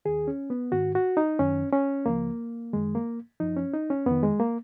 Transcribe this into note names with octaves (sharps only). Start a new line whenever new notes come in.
D#2 D#3 G#4
C#4
B3
G#2 D#3 F#4
F#4
D#4
F#2 D#3 C#4
C#4
C#2 C#3 F3 A#3
F#2 D#3 G#3
A#3
F#2 F3 D#4
C#4
D#4
C#4
F2 D#3 B3
G#3
A#3